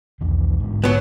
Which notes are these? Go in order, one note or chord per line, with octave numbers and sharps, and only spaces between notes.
B1 E2 D#3
G#2 D3
F#3 B3